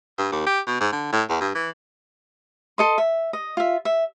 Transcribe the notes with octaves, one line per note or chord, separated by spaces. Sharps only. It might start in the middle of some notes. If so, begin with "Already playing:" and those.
G2
D#2
G4
B2
G#2
D3
A2
E2
G2
E3
A4 D#5 C6
E5
D#5
F4 E5
E5